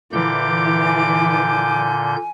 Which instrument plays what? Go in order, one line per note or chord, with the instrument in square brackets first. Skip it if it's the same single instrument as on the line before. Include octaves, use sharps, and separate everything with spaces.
[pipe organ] A#2 D3 G6 [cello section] E3 [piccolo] D6
[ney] G#5